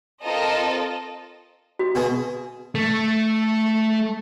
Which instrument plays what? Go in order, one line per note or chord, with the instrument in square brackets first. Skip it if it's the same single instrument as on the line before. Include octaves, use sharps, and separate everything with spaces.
[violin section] C4 F4 A4 A#4 D#5
[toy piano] F#4
[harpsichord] B2 G#3
[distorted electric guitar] A3